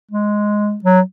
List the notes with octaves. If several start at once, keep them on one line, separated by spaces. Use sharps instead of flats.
G#3
F#3